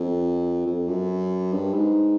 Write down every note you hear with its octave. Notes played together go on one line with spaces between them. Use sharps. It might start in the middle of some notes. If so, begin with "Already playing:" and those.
Already playing: F2
F2
F#2
G2
G#2